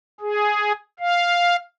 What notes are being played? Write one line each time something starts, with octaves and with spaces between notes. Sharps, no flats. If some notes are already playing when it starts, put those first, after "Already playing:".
G#4
F5